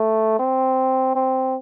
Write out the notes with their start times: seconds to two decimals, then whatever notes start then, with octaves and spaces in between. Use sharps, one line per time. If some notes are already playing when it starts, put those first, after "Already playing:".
Already playing: A3
0.39 C4
1.15 C4